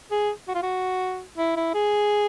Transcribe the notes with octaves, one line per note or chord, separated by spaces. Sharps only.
G#4
F#4
F4
F#4
E4
E4
G#4